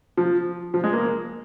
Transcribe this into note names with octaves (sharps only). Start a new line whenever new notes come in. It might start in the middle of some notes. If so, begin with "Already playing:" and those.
F3
F3
G#3
A#3